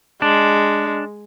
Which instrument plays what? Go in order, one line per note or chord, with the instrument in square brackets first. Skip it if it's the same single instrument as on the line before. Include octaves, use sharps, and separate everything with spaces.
[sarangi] G#3 [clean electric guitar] D4